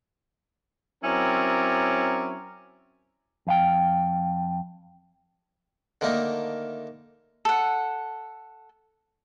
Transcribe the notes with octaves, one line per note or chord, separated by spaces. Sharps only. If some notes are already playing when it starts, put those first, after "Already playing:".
F#3 C4 C#4 E4 A#4 D5
F2 F5 G5
D3 D#3 A3 A#3 D#4
A4 F#5